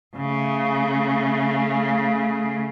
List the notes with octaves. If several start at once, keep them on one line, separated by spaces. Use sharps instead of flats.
C#3 A3